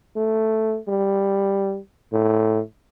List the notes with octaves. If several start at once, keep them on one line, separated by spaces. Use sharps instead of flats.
A3
G3
A2